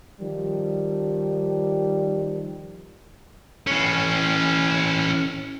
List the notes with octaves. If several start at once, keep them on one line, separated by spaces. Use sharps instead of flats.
D#3 F3 G3
E3 C#4